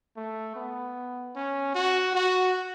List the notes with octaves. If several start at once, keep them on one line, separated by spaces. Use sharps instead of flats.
A3
B3
C#4
F#4
F#4